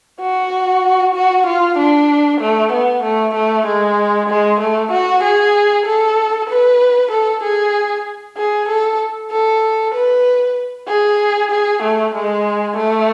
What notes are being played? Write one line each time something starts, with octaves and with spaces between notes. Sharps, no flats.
F#4
F#4
F4
D4
A3
B3
A3
A3
G#3
G#3
A3
F#4
G#4
A4
B4
A4
G#4
G#4
A4
A4
B4
G#4
G#4
A3
G#3
A3